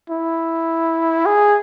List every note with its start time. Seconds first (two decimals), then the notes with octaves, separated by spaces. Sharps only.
0.10 E4
1.26 G#4